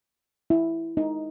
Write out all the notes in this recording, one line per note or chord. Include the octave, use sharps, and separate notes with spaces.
E4
D#4